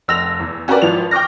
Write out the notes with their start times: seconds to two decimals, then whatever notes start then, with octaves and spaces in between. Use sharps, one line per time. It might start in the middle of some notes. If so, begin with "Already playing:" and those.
0.08 F1 E6 A#6 F7
0.40 E2
0.68 C#4 F#4 G4 A#4 B4 D5
0.82 G#1 E3 F3 F7
1.11 G5 C#6 D6 F6 A#6